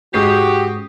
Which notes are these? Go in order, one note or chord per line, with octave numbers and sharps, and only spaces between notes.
G#2 G#3 C#4 F#4 G4 D#6 G6 C7